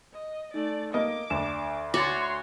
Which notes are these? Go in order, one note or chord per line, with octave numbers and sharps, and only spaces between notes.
D#5
A3 D#4 D5
A#3 D#5 D6
D2 D4 E7
F#4 C#5 C6 D6 A6